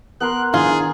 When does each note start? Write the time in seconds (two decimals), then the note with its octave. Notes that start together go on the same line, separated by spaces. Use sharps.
0.21 B3 A#4 C6 F#6
0.54 D#3 D4 E4 F4 G#4